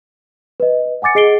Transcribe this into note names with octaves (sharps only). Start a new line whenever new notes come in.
B4 D#5
F#5 G#5 D6 A6 C#7
G#4 D#5 C7 D7 G7